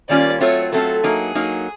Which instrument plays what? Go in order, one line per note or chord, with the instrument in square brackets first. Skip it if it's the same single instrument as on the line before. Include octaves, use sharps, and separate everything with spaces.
[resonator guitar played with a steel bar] D#3 G3 A#3 C#4 F4 [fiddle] D5
[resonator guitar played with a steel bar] F#3 A3 C4 F4 [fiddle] C#5
[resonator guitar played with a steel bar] F#3 A3 C4 F4 [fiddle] A4
[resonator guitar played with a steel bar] F#3 A#3 D#4 [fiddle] G#4
[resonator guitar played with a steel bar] F#3 A#3 D#4